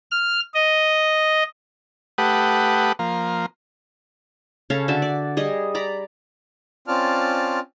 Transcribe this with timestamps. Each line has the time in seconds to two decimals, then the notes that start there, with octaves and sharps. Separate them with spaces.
0.11 F6
0.54 D#5
2.18 A3 G4 B4 F#5 D#6
2.99 F3 A#3
4.70 C#3 C#4 A4 F5
4.88 D3 F#4 E5 A5
5.02 D5
5.37 G3 G#4 D#5
5.75 D5 A#5 B5
6.88 C4 C#4 F4 D5 A5 F6